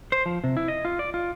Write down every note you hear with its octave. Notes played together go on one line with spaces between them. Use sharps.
C5
F3
C3
E4
D#5
F4
D5
F4